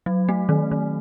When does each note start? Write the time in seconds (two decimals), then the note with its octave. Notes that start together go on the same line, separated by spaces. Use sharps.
0.06 F#3
0.29 A3
0.49 D#3
0.71 D#3